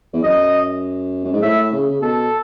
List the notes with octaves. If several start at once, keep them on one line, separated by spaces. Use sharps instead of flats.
E2
F#2 D#5
F#2
G#2
A2 E5
C#3
C#3
B2 A4